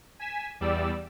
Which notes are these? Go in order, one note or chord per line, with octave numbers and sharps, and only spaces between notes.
G#5 B6 E7
E2 G3 D5 E6